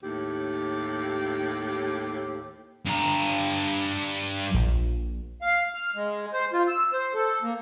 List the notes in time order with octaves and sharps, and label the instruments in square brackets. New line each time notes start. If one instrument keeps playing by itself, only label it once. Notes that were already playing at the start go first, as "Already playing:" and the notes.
[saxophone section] D#2 A2 G4
[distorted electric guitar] G2 A#5
[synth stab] A#1
[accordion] F5
F6
G#3
C5
F4
E6
C5
A4
A#3